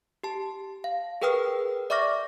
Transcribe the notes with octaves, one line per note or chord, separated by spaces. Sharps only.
G4 A5
F5
G#4 A#4 B4 G5 D#6 F6
D5 E5 C#6 D6 F6 A#6